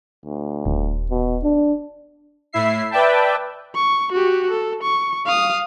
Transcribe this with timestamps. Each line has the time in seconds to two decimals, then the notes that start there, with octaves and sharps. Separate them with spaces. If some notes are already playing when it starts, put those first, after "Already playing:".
0.25 D2
0.65 D#1
1.11 B2
1.43 D4
2.53 A2 E4 E5 C7
2.91 B4 D5 E5 G5 A5
3.75 C#6
4.12 F#4 G4
4.51 A4
4.83 C#6
5.26 F5 D#6